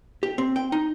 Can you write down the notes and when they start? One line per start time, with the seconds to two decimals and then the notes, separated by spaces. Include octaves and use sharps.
0.23 G4
0.38 C4
0.56 G5
0.72 D#4